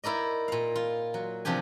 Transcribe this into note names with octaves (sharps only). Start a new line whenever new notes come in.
D#4 E4 A#4 D5 D#5
A#2 F5
F4
F#3
C3 F3 D4 G4 G#5